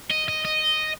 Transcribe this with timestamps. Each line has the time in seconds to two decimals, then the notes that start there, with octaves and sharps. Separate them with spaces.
0.11 D#5
0.28 D#5
0.45 D#5